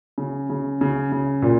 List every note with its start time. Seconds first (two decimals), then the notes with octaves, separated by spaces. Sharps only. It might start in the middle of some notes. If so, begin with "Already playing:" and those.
0.18 C#3
0.50 C#3
0.81 C#3
1.12 C#3
1.42 A#2